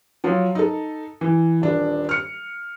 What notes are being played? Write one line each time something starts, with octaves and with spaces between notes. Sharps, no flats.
F3 F#3
D#4 A4
E3
D#1 D4
F6 C#7